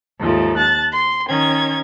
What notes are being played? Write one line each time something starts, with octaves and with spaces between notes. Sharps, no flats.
D#2 G#2 F3 A3
A5 F#6 A6
C6
D#3 C#4 G#6